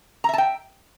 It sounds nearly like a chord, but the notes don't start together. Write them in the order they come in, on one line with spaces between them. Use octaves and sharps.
A#5 E5 A5 G5